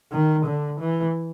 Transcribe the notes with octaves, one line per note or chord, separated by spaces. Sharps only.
D#3
D3
E3